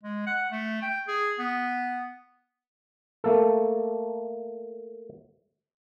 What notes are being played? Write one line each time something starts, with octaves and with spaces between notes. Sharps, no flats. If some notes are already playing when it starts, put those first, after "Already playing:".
G#3
F#5
A3
G5
G#4
B3
A3 A#3 A4